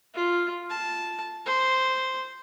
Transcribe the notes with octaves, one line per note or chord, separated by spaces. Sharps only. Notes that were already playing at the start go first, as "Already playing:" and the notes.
F4
A5
C5